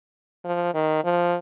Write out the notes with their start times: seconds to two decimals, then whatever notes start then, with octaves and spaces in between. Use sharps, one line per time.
0.45 F3
0.74 D#3
1.04 F3